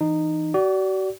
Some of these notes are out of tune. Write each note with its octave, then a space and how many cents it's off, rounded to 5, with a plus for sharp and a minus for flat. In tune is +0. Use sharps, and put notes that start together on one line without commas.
E3 +0 D#4 -15
F#4 +40 D5 -20